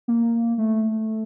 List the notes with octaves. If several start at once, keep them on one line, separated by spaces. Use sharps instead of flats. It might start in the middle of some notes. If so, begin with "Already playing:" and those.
A#3
A3